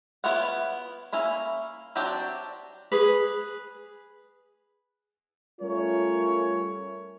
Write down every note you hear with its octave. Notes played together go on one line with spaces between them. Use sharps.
B3 E4 F4 C#5 F#5
A#3 C#4 E4 B5
F#3 C4 D4 F#4 G4
G#4 B4
G3 A3 C#4 F4 A#4 C#5